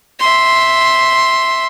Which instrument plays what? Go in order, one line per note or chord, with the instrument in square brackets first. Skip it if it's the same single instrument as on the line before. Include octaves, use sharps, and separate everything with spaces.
[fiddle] E5 C6